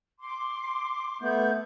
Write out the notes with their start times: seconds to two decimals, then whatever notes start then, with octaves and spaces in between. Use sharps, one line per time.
0.19 C6 D6
1.22 A3 B3 G6